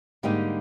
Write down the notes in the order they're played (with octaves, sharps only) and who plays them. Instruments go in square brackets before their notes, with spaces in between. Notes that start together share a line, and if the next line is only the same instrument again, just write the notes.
[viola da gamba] G#2 [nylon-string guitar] D3 G3 A#3 D#4 G4